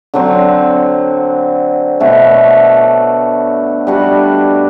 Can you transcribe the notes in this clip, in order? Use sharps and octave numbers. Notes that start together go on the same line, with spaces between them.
D3 F#3 C4
B2 A3 D4 F#4
G3 D4 F#4 B4